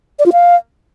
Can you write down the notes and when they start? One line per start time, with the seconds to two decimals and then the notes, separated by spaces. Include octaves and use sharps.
0.19 D5
0.26 F4
0.33 F5